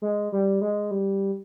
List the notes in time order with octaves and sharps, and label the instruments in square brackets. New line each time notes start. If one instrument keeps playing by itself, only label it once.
[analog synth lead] G#3
G3
G#3
G3